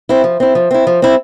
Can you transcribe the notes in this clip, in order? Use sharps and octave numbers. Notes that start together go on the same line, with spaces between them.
C4 E4
F3
C4 E4
F3
C4 E4
F3
C4 E4